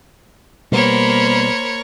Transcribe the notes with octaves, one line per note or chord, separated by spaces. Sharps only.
B2 G3 A#3 B3 A#4 C5 C#5 B5